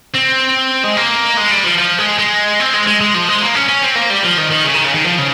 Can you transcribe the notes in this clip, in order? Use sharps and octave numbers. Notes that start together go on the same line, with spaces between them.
C4
G#3
A#3
G#3
G3
F3
F3
G#3
G#3
C4
G#3
G#3
G#3
F3
G#3
A#3
C#4
C#4
C4
A#3
G3
F3
D#3
D#3
C#3
D#3
C#3
D#3
F3
C#3